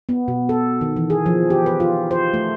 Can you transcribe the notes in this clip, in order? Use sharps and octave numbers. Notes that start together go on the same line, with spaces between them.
B3
B2
A4
D#3
E3
G#4
F3
G4
B4
F4
C5
A3